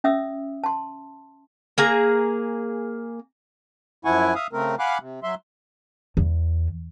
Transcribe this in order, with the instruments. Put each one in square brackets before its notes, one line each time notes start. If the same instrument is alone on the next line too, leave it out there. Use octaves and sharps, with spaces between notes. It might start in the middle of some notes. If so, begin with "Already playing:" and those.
[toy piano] C#4 E5 D#6 E6
A5 C6
[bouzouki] A#3 G#4 A#5
[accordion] F#2 F3 E4 F#5 G#5 C#6
E5 F5 D#6
C#3 A3 C4 A#4
F5 F#5 G#5 B5 D6 F#6
C3
F#3 E5 C6
[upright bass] E2